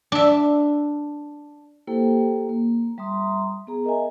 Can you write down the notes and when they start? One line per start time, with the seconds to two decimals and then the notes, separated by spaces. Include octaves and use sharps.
0.12 D4 E5
1.87 A#3 E4 G4 A4 C5 G5
2.49 A#3
2.98 G3 E5 A#5 C6 D#6
3.67 B3 G#4 A#5
3.84 A#4 D#5 E5 G#5